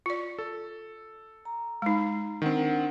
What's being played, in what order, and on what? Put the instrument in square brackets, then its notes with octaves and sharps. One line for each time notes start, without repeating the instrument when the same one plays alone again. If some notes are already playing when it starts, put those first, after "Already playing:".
[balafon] F4 D5
[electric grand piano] A4
[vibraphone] A#5
[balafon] G#3 D#4
[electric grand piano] D#3 C4 [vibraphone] D4 F#5